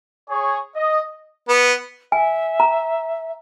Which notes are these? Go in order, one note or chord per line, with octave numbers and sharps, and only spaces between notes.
G#4 C#5
D#5
B3
E5 G#5
A#5